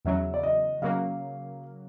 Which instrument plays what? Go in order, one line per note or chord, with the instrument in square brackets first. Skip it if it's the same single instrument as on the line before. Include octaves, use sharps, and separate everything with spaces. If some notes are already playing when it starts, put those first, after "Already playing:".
[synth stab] E2 C#3 F#3 [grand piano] E5
[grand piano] D5
D#5
[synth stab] C#3 F#3 A#3 [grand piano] F5